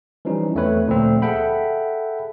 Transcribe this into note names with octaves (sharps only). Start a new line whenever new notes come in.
E3 F3 G3 C#4 D#4
E2 A3 C4 B4 C#5
D2 A#2 F3 A3 C4
G#4 A4 E5 F#5 G5 B5